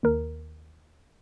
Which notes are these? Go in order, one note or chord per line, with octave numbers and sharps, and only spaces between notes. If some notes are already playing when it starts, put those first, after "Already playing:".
D#2 A#4